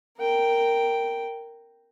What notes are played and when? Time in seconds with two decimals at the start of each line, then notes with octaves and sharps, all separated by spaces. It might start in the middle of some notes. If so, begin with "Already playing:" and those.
0.17 A#4 G5